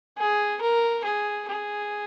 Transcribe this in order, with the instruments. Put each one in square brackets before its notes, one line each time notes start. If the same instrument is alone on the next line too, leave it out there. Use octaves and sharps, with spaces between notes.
[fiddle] G#4
A#4
G#4
G#4